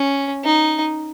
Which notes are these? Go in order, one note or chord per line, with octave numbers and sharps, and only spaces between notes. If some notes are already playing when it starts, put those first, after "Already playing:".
Already playing: C#4
D#4